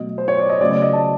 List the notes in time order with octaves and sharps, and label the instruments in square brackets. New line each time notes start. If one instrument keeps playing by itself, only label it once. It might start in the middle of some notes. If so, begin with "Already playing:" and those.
Already playing: [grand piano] B2 F#3 A3 D#5
C5
C#5
D5
D#5
C#3 F#3 A3 D5
D5
D#5
A5